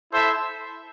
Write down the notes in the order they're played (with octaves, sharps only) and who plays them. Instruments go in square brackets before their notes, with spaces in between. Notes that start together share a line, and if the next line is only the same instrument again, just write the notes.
[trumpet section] E4 A4 C5 E5